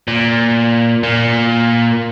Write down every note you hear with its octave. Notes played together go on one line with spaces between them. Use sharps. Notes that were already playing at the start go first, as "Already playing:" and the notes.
A#2
A#2